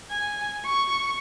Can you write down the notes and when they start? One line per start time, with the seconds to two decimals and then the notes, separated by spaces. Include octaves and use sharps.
0.11 G#5
0.65 C#6